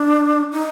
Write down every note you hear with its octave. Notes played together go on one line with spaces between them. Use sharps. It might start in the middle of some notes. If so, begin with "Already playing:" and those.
Already playing: D4
D#4